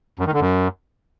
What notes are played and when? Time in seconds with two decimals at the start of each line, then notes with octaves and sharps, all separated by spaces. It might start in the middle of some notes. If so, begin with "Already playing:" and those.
0.19 F#2
0.26 D#3
0.34 D3
0.41 F#2